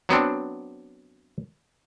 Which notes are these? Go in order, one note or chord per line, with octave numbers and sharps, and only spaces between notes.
F#3 B3 C4 D4